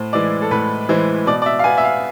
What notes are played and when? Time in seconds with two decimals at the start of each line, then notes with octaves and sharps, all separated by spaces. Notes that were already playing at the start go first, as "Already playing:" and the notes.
Already playing: A2 C5
0.13 E3 G#3 D5
0.42 A4
0.51 A2 B4
0.89 E3 G#3 C5
1.26 B2 D5
1.42 D5
1.46 E5
1.59 F5
1.64 B3 G#5
1.78 E5
1.84 F5